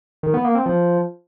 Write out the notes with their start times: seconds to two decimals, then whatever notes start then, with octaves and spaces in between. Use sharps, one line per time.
0.23 D#3
0.34 B3
0.44 A#3
0.55 C4
0.66 F3